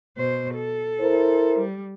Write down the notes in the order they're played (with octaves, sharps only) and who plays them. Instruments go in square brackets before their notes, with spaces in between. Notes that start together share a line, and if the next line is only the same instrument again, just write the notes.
[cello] B2 C5
A4
[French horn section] E4 A#4 C5
[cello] G3